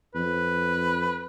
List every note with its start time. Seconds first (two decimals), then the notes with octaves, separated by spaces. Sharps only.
0.15 F2 B4